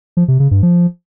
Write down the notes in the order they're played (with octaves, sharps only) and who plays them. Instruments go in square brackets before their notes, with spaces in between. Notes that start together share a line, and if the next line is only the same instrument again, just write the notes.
[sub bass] F3
C3
C#3
G2
F3